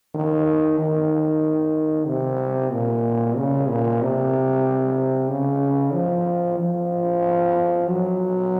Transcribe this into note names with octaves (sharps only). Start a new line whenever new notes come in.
D#3
D#3
C3
A#2
C#3
A#2
C3
C#3
F3
F3
F#3